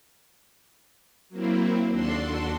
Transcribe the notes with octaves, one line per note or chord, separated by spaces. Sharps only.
F#3 A#3 C4 E4
D#2 D4 F#4 A4 C6